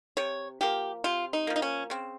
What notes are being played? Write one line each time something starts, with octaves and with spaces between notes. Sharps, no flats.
C3 C#5
F3 A#3 G4
C3 F4
D#4
F3 A#3
D#4
C#4
C#3 C4